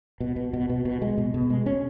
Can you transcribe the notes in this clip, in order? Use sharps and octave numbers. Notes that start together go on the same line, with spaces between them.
B2
B2
B2
B2
B2
G#3
B2
B2
G#3
C#4